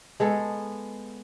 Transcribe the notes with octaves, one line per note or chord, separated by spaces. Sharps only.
G#3 B3 A4